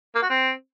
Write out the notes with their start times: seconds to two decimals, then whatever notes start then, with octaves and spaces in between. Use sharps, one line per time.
0.15 A#3
0.23 F#4
0.30 C4